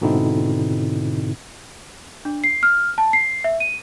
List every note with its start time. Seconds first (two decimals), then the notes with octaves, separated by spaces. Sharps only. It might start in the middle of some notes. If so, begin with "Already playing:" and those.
0.01 G#2 B2 D3 C4 D#4 E4
2.25 D4
2.44 C7
2.63 F6
2.98 A5
3.13 C7
3.44 E5
3.60 D#7